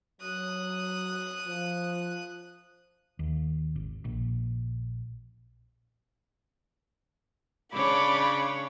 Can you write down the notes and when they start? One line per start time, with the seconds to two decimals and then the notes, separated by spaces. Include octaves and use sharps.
0.21 F#3 D#6 F#6
1.47 F3
3.19 D#2
3.76 G#1
4.05 A#1
7.73 C#3 D4 C#5 B5 D6